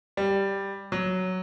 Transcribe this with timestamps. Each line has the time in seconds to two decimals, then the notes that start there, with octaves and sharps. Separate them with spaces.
0.17 G3
0.92 F#3